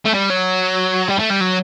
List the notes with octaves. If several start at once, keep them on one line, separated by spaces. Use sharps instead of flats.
A3
G3
F#3
G3
A3
G3
F#3